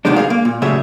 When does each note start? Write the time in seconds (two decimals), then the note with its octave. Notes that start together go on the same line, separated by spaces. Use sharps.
0.05 D2 C3 D#3 G3 G#3 D4
0.16 G2 A#2 G#4 F5
0.30 A#3
0.45 A#2
0.62 A2 C#3 F#3 G3 G#4 E5